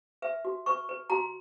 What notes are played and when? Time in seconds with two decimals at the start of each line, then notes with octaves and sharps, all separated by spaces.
0.22 B4 E5
0.45 F#4
0.66 B4 C#6
0.89 B4
1.10 F#4 A#5